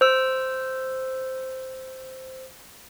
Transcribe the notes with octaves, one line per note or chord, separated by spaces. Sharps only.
C5 E6